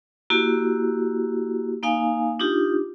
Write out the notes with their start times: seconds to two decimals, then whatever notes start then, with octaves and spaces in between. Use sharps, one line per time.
0.30 A#3 E4 F#4 G4
1.83 A#3 D#4 F5 G#5
2.40 D4 D#4 F4 G4